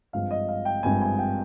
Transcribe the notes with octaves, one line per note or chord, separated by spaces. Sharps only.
G#1 G2 F3 G#3 F5
D#5
F5
G5
G#1 G2 F3 G#3 G#5
G#5
G5